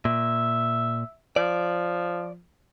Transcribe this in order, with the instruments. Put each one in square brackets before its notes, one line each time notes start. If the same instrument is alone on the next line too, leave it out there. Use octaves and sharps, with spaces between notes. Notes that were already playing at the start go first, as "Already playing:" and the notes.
[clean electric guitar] A#2 [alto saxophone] E5
[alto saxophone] F3 [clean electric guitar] D5